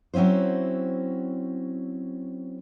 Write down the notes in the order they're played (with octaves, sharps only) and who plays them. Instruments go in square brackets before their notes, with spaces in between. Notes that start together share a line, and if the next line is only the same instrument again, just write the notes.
[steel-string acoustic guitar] F#3 C4 C#4 E4 C5